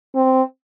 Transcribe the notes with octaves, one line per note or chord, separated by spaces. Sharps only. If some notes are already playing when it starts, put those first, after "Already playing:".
C4